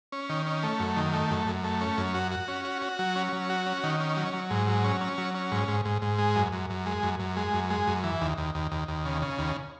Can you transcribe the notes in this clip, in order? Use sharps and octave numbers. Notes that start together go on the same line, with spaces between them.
C#4
D#3
C#4
A3
F#2
D#3
A3
F#2
F#2
A3
C#4
F#2
F#4
F#4
C#4
F#4
F#4
F#3
C#4
F#3
F#4
C#4
D#3
C#4
F#3
F#3
G#2
F#3
C#4
C#4
F#3
C#4
G#2
G#2
G#2
G#2
G#3
F#2
F#2
F#2
G#3
F#2
F#2
G#3
F#2
G#3
F#2
E3
D#2
D#2
D#2
D#2
D#2
C#3
C#3
D#2